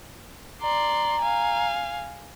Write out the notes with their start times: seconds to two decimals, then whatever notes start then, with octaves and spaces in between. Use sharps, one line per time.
0.62 D5 A#5 C6
1.22 F5 G#5